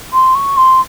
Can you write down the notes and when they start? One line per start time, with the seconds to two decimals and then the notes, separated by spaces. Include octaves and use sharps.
0.13 C6
0.35 C#6
0.57 C6